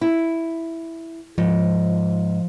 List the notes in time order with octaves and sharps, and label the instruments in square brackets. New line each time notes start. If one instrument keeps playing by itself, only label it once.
[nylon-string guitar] E4
[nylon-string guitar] G#2 [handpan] F3